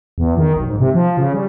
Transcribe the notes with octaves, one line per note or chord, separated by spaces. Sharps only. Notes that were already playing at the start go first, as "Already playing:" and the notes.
E2
D#3
B1
G#2
C3
F3
C#3
G3